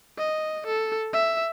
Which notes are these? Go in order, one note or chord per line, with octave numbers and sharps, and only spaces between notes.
D#5
A4
E5